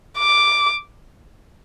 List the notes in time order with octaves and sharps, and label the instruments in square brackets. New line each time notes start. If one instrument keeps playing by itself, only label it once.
[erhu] D6